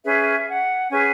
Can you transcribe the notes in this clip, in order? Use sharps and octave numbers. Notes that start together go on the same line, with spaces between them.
C#4 G#4 B4 E5
F#5
C#4 G#4 B4 G#5